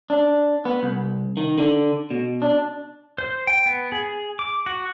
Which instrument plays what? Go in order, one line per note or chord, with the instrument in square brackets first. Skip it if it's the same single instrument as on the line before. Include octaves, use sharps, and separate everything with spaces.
[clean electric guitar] D4
B3
C2
D#3
D3
B2
D4
[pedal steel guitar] C5
G5
B3
G#4
D6
F#4